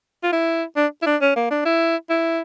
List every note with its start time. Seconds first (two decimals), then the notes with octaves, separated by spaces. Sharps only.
0.24 F4
0.33 E4
0.76 D4
1.02 E4
1.06 D4
1.22 C#4
1.36 A#3
1.51 D4
1.65 E4
2.10 E4